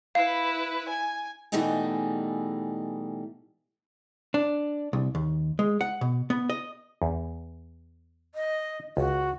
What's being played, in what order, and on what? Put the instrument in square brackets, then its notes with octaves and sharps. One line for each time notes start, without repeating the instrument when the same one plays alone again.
[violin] E4 B4 [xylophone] F5
[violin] G#5
[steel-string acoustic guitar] B2 E3 G3 A3 D#4 G#4
[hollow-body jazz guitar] D4
C2
D#2
G#3
F#5
B2
B3
D#5
[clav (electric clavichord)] E2
[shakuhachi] D#5
[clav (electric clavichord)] C#2 [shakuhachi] F#4